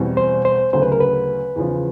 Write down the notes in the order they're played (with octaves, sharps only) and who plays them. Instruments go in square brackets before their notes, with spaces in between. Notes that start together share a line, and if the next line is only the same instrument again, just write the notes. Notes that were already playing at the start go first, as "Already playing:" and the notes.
Already playing: [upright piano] E2 B2 G3 C4
[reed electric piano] C5
C5
[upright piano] D2 C#3 F#3 [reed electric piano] C5
[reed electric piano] B4
A#4
B4
[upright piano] E2 C#3 F3